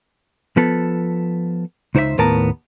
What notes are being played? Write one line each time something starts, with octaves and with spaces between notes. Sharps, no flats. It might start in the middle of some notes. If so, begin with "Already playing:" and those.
F3 B3 A4
C#2 D#4 C5 C#5 E5
D#2 A2 B3 A#4 A5